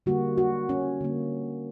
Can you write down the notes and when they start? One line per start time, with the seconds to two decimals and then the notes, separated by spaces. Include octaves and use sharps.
0.06 D3 G3 A#3 F#4
0.38 F#4
0.69 C#4
1.01 D3 G3 A#3